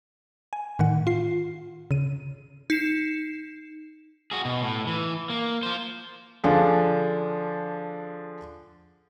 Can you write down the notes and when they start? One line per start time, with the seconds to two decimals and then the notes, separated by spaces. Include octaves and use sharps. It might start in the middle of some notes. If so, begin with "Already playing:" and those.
0.53 G#5
0.79 A2 D#3 F#5
1.07 F4 C7
1.91 C#3 D#7
2.70 D#4 C7 E7
4.31 F#4 G#4
4.45 B2
4.62 A2
4.87 E3
5.30 A#3
5.63 F4 C5
6.44 D3 F3 D4 G#4 F5